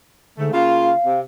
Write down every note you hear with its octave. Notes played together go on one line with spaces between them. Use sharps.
G#2 D3 A3
C#3 A#3 F4 F5
C3